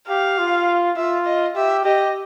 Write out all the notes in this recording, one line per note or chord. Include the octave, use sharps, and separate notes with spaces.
G4 F5
F4
F4 E5
D#5
G4 E5
G4 D#5